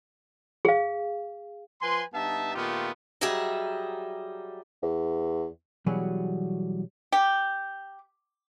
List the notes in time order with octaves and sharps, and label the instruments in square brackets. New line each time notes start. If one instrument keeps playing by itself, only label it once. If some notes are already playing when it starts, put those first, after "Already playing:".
[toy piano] G#4 F5
[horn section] F3 B4 G#5 C6
G2 B3 D#4 E5 A5
A#2 D#3 A3 B3 F4 G4
[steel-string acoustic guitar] F#3 G3 G#4 D#5 E5 A#5
[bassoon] E2
[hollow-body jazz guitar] B2 E3 F#3 G3 F#4 G#4
[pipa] G4